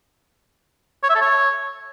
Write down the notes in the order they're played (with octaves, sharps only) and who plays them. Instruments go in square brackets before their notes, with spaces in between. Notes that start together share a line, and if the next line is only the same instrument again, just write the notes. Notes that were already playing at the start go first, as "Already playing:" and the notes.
[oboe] C#5
E5
A4
C#5